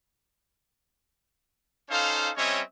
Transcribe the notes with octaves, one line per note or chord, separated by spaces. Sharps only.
C#4 D#4 A4 C5 F5
G3 C4 C#4 C#5 D#5 E5